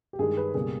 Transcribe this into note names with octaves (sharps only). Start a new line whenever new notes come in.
G4
G2 D#3 G#3 G#4
B4
C#2 B2 G3 A#3 G#4